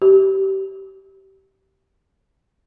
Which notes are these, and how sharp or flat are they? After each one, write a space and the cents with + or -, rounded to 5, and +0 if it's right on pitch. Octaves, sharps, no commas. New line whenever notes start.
G4 -25